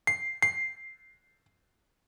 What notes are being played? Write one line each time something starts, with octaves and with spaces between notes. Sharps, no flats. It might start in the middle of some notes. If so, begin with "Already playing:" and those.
C7
C7